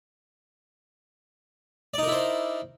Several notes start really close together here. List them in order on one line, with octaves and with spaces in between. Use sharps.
D5 D#4 A#4 E4 C5